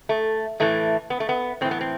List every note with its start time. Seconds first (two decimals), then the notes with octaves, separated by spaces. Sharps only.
0.09 A3
0.60 A2 E3 A3
1.10 B3
1.20 A3
1.29 B3
1.61 A2 E3 C4
1.71 B3
1.81 C4